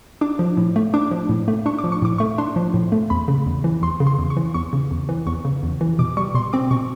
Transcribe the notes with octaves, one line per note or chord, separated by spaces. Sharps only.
D4 D6
F3
A2
A3
D4 D6
F3
A2
A3
D4 C#6
D6
F3
C#6
A2 D6
A3 C#6
D4 C6
F3
A2
A3
E2 B5
C#3
E2
E3
E2 C6
C#3
C6
E2
C#6
E3
E2 C#6
C#3
E2
E3
E2 C#6
C#3
E2
E3
B2 D6
G3 C#6
B2 C6
C4 D6
B2 C#6